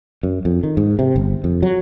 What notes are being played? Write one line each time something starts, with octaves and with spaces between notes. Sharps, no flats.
F#2
F2
D#3
G#2
C3
G1
F2
F#3